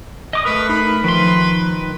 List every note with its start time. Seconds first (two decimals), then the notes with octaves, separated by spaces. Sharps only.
0.33 D#5 D6 D#6
0.45 A3 A#4 B4
0.69 D#4 B5
1.04 D#3 F3 B4 C6